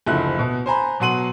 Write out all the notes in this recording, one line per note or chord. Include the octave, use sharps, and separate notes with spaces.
F#1 D2 F3 E4 F#6
B2
C5 G#5 A#5 B5
B2 F#3 F#5 C6 D#7 F#7